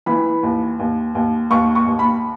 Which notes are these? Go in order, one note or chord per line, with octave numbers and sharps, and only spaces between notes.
E3 B5
D#2
D#2
D#2
D#2 C#6
C#6
D#2
B5